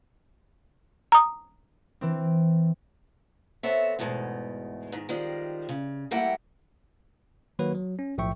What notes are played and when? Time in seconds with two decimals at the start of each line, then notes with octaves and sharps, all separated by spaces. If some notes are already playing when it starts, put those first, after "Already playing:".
1.12 A#5 D#6
2.01 E3 C4
3.63 B3 C4 A4 C#5 E5
3.99 E2 G#2 B2 G#3 A3
4.92 G#2 D#3
5.09 D#3 F3 G3 G#3
5.69 C#3
6.11 G3 A3 A#3 E4 F#5 G5
7.59 D#3 F#3 A#3 F#4 B4 C#5
7.75 F#3
7.99 C#4
8.18 B1 A2 F3 E5 G5 C#6